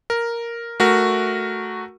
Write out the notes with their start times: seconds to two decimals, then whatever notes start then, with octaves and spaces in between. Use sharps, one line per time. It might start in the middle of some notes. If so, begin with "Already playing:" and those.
0.10 A#4
0.80 A3 F#4 A#4